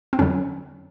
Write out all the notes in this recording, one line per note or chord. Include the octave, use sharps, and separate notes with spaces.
C4
F2 D3 F#3 C#4